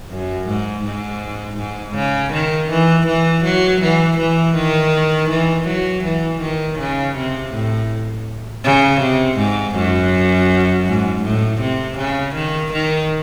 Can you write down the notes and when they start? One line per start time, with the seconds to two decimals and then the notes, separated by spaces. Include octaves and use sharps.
0.10 F#2
0.48 G#2
0.85 G#2
1.58 G#2
1.95 C#3
2.33 D#3
2.70 E3
3.06 E3
3.44 F#3
3.81 E3
4.18 E3
4.55 D#3
5.30 E3
5.67 F#3
6.04 E3
6.41 D#3
6.78 C#3
7.16 C3
7.52 A2
8.64 C#3
9.00 C3
9.37 G#2
9.75 F#2
10.86 G#2
11.23 A2
11.61 C3
11.98 C#3
12.35 D#3
12.73 D#3